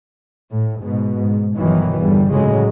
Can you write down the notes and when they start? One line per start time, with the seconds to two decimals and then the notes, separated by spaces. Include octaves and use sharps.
0.51 A2
0.82 G#2 B2
1.17 G#2
1.57 G1 B2 D#3 E3 F#3
1.99 G1 E2 D3 G3
2.30 A2 C#3 F#3 G#3